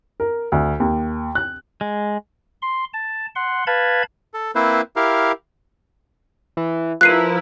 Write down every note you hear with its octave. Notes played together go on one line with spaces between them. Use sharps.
A#4
D2
D#2
F#6
G#3
C6
A5
F#5 C6
B4 F5 A5 B5 G#6
A4
A#3 C4 E4 B4 C5
E4 G4 A#4 F5
E3
F3 E4 A#4 B4 F#6 C7 D#7